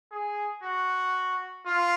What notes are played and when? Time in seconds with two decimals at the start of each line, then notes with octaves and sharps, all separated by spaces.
0.12 G#4
0.64 F#4
1.66 F4